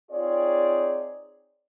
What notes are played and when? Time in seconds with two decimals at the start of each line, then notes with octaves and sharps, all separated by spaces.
0.11 C4 D#4 F4 G#4 C#5 D5